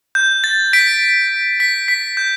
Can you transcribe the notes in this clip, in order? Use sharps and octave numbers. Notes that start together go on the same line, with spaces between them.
G6
A6
B6 D7
B6
B6
G6